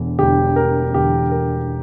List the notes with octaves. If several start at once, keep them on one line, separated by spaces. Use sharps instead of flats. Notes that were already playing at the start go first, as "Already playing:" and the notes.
Already playing: E1 E2 D3
E1 E2 D3 G4
A#4
E1 E2 D3 G4
A#4